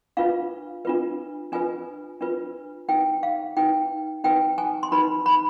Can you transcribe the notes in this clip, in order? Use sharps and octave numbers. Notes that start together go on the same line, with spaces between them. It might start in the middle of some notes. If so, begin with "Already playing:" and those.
D4 F4 B4 F5
D4 F4 B4
D4 F4 B4 G#5
D4 F4 B4
D#4 B4 G5
F5
D#4 B4 G5
D#4 B4 G5
G#5
C6
D#4 B4 B5
B5